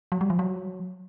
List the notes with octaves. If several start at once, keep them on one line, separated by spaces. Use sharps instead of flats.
F#3
G3
F3
F#3